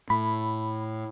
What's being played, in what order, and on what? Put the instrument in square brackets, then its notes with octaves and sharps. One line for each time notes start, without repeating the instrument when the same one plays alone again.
[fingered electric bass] A2 [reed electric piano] B5